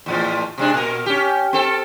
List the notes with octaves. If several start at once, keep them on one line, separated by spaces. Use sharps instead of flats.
E2 A2 F3
C3 G#3 D4
A#2 A#4
C#4 G4
C4 A4